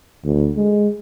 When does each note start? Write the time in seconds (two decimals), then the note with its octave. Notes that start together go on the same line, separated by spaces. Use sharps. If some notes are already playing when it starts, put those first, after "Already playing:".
0.25 D2
0.56 G#3